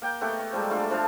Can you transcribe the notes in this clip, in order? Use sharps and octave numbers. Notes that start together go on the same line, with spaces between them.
A#3 G5
A3 B3 D#4 G4
C#6
F3 G3 G#3 A4
A3 D4 F4 F#4
F3 D4 F5 A5